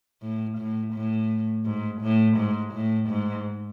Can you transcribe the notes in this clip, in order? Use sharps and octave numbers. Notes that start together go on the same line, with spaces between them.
A2
A2
A2
G#2
A2
G#2
A2
G#2